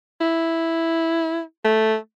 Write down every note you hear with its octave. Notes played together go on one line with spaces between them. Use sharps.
E4
A3